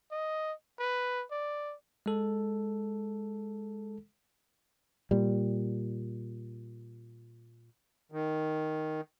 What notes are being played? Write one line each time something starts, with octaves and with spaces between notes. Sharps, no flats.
D#5
B4
D5
G#3 A4
A#2 G3
D#3